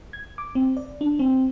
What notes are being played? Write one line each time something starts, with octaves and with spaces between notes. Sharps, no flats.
G#6
D6
C4
D5
D4
C4